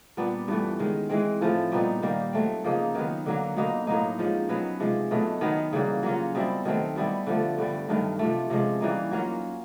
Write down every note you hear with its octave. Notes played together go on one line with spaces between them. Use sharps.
A#2 G3 B3 D4
G2 E3 A3
D#3 G#3 C#4
E3 G#3 C4
A2 F3 A3
A#2 G3 B3 D#4
D#3 G3 A#3
F#3 A3 C4
C#3 F3 A#3 D#4
D#3 F#3 B3
D3 F#3 A#3
B2 F#3 A#3 D#4
A2 F#3 A#3 D#4
F3 G#3 C#4
B2 F#3 B3
C3 F3 G#3
B2 F#3 A3
D#3 F#3 B3
C#3 E3 G3 A#3
F#3 A#3 C#4 F4
B2 G3 C4 E4
D#3 F#3 A3 C4
B2 G3 B3 E4
D3 F3 A3
G2 D3 G3
G2 D#3 F#3 A3
C3 F3 A3
C3 F3 G#3 C#4
E3 G3 A#3 D#4
F#3 A#3 C#4 F4